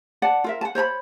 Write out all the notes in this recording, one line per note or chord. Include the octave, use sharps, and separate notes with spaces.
D5 F#5 A5
F4 A#4 E5
F#5 A5
C5 C#5 A#5 B5